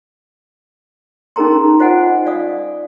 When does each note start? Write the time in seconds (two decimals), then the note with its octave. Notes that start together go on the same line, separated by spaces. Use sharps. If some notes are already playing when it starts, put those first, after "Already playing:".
1.36 C#4 D#4 G#4 A#4 A#5 C6
1.79 F4 C5 D#5 F#5 G#5
2.26 D5 F5 D#6